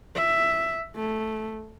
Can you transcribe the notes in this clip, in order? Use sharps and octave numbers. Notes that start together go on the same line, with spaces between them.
E5
A3